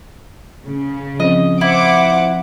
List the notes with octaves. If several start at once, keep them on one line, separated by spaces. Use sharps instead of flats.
C#3
F3 C4 D#5
E4 C5 F#5 D6